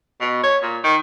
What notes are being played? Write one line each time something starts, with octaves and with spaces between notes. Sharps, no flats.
B2
C#5
A#2
D#3